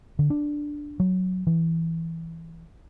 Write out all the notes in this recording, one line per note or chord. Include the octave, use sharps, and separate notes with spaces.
D3
D4
F#3
E3